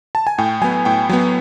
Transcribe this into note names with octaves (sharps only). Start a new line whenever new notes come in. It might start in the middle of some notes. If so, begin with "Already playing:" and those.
A5
G#5
A2 G5
F#3 B3 G#5
A2 G5
F#3 B3